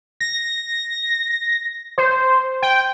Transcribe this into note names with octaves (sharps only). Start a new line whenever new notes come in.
A#6
C5
G5